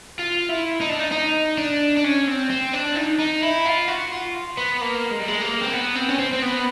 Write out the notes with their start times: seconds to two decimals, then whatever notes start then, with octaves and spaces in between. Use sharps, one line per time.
0.19 F4
0.49 E4
0.81 D#4
0.90 D4
0.99 D#4
1.12 D#4
1.58 D4
1.97 D4
2.04 C#4
2.27 C4
2.50 C4
2.74 D4
2.96 D#4
3.19 D#4
3.42 E4
3.66 F4
3.88 F#4
4.12 F4
4.57 B3
4.81 A#3
5.11 G#3
5.20 G3
5.28 G#3
5.42 A#3
5.61 C4
5.73 B3
5.95 C4
6.09 C#4
6.19 C4
6.33 C4
6.42 B3